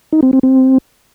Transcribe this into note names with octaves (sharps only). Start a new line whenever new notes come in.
D#4
C4
C4
C4